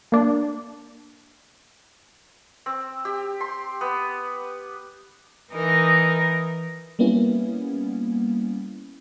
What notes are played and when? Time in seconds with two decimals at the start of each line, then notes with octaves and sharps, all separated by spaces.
0.12 A#3 D4
2.66 C4
3.05 G4
3.41 C6
3.81 B3
5.52 E3 D#4 A#4
6.99 G3 A#3 B3 C#4 E4